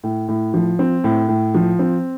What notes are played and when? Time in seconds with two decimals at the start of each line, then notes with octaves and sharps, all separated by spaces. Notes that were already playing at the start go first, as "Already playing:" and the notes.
0.04 A2
0.28 A2
0.54 F3
0.79 C4
1.04 A2
1.28 A2
1.54 F3
1.79 C4